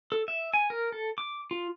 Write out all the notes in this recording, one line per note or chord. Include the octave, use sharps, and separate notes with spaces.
A4
E5
G#5
A#4
A4
D6
F4